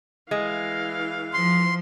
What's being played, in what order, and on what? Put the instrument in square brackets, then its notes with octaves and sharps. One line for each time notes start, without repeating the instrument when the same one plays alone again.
[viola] E3 F5 [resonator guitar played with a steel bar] G#3
[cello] F3 [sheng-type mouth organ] C6